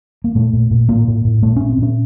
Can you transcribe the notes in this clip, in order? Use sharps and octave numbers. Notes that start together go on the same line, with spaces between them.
A#3
A#2 A3
A#2
A#2
A2 A#3
A2
A2
A#2 A3
A#2 C#4
C4
A#2 C#4